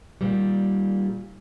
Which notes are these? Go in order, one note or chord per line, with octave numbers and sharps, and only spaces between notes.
A#2 D#3 G3